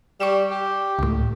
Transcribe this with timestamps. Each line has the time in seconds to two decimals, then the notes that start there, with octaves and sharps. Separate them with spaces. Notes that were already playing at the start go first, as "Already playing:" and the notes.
0.20 G3 C#6 E7
0.50 G4
0.99 C#2 A2